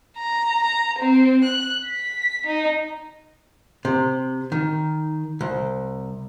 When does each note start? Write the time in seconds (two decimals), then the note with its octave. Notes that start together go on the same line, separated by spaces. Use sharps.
0.17 A#5
0.63 A#5
0.99 C4
1.44 F#6
1.86 B6
2.47 D#4
3.85 C3
4.52 D#3
5.41 C2